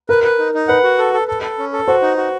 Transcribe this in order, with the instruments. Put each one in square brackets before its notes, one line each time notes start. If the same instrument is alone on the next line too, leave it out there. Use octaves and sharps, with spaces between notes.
[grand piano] A#4 [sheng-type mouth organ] B4
[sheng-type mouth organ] B4
D#4
D#4
[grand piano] B4 [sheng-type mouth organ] F#5
[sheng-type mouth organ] F#4
A4
A4
A4
A4
C#4
A4
[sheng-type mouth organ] F#4 [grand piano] C5
[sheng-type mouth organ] D#4
F#4